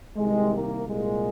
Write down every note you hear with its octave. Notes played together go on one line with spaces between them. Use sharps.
C2 C3 D#3 G#3
A#3
C2 A#2 G#3